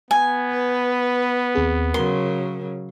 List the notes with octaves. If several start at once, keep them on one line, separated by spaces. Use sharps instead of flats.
B3 G#5
B4
D#2 C4 G#4
C#3 F#3 A#4 C6